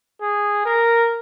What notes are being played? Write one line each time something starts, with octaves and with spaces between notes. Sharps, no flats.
G#4
A#4